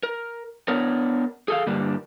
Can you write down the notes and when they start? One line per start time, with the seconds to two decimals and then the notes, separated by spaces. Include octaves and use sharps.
0.03 A#4
0.68 B3 D4 A#4 C#5
1.48 G#4 A4 F5
1.66 G2 D3 G3 A#3 D4